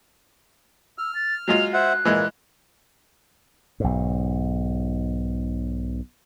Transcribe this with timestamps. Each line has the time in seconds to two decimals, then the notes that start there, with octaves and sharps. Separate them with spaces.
0.98 E6 F6
1.15 A6
1.48 F#3 G#3 F4 F7
1.73 C5 E5 F#5 F#6
2.05 A#2 E3 G#3
3.80 B1 G#2